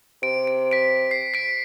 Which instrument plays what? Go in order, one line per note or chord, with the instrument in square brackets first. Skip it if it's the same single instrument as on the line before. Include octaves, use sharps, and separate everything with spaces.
[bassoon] C3 [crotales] D7
[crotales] D7
B6 D7
C7
B6 D7